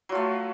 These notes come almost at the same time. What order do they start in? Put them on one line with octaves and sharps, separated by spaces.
F#3 F4 A3